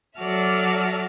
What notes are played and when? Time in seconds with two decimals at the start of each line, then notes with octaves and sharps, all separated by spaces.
0.18 F#3 F#4 A4 D5 E5 F6